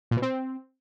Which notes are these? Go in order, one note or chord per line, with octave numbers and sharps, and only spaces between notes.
A#2
B2
C4